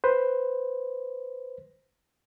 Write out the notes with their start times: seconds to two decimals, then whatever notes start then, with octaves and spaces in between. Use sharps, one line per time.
0.04 B4 C5